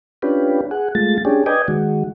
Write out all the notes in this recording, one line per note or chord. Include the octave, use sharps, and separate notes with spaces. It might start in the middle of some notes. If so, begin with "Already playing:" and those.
C#4 D4 F4 G4 B4
G#4 F#5
G#3 A3 F4 A6
C#4 D4 G4 G#4
B4 D5 D#5 G5 G#5
D#3 G#3 F#4